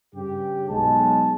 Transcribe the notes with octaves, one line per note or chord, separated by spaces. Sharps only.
G2 C#3 G4
B1 G#3 A5